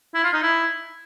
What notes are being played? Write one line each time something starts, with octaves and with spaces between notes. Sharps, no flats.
E4
F4
D#4
E4